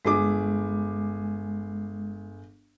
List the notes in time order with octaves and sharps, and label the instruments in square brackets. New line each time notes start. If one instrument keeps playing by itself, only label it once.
[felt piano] G1 G#4 D6 [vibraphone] G#3